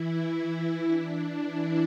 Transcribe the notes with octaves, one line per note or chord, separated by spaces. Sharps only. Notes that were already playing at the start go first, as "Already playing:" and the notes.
Already playing: E3 E4
D4
E3 E4